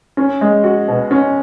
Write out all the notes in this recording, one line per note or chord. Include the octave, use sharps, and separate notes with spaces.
C#4
G#3
F#4
B2
C#4